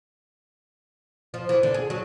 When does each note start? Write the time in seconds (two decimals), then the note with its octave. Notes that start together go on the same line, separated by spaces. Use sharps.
1.34 F3
1.49 E3
1.63 D3
1.74 G#4
1.90 F#3